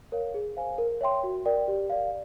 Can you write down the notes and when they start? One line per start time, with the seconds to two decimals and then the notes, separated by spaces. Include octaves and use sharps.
0.12 A#4 C#5 F5
0.34 G#4
0.57 C5 F5 G#5
0.78 A#4
1.01 C#5 E5 G5 C6
1.24 F#4
1.46 A#4 D5 G5
1.68 G4
1.90 A#4 D5 F5